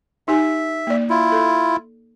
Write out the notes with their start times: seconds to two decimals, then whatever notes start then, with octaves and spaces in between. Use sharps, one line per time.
0.28 D#4 G4 E5 G#5
0.87 A#3 D5
1.10 E4 F4
1.32 A4